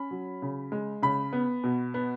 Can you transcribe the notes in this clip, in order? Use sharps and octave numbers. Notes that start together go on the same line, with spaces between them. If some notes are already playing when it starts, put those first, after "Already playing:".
Already playing: C#4 B5
F#3
C#3
G#3
C#3 B5
B3
B2
B3